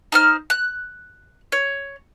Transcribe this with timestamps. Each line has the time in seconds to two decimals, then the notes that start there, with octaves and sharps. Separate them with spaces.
0.12 D#4 C5 F6
0.50 F#6
1.52 C#5